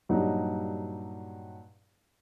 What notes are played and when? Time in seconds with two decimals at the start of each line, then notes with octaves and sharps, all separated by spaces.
0.09 G2 A#2 F#3 G3 D#4